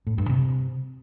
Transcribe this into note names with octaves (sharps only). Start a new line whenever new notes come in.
A2
G2
C3